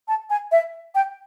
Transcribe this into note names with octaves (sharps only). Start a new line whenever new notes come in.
A5
G#5
E5
G5